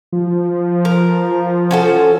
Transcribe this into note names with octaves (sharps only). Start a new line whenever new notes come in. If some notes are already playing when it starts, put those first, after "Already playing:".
F3
A#4
F3
C#4 F#4 A4